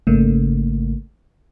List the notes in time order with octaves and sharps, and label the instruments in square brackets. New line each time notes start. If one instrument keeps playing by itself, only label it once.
[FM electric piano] G#1 C#3 A3 A#3